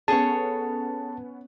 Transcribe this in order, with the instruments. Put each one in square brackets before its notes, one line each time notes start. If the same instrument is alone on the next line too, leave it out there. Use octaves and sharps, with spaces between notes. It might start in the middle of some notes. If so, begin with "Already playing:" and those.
[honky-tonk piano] B3 C#4 [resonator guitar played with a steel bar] G#4 A4 C#5 [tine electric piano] A5